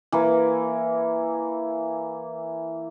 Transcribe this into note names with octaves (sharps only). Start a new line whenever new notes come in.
E3 A#3